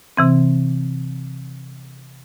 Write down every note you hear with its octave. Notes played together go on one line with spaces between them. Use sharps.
C3 E3 C4